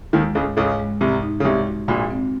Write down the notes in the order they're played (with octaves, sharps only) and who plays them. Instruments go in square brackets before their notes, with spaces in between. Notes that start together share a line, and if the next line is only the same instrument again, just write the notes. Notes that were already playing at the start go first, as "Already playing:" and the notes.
[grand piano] D#2 D#3 [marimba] G#3
[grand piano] C#2 C#3 [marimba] G#2
[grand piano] C#2 C#3 [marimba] G#2
[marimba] G#3
[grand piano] C2 C3 [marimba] G#2
[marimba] D#4
[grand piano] C#3
[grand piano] C2 C3 [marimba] G#3
[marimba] F#4
[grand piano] A#1 A#2 [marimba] F#4
[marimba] C4